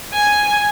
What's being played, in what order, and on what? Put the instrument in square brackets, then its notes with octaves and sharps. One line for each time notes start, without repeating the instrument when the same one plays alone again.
[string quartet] G#5